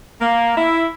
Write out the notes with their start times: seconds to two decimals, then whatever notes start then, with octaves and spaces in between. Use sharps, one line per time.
0.21 A#3
0.55 E4